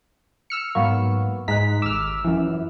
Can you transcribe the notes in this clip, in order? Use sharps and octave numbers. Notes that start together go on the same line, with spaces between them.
E6 F6 C#7
G#2 F#3 A#3 B3 C#6
G#2 G#3 A#5 F#6 B6
G#1 D6 E6 F6
F#2 E3 F3